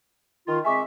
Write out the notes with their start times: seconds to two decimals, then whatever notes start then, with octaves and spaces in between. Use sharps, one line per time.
0.47 D#3 F4
0.65 G#3 C4 E5 G#5 C#6 D6